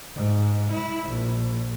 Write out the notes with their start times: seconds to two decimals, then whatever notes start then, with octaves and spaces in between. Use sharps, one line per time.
0.15 G#2
0.72 E4
1.09 A#1